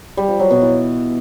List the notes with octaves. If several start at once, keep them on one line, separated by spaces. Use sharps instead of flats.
G3
F3
F#3
B2
E3